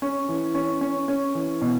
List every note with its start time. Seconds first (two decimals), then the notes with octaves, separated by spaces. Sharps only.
0.02 C#4
0.29 E3
0.55 C#4
0.81 C#4
1.08 C#4
1.35 E3
1.62 B2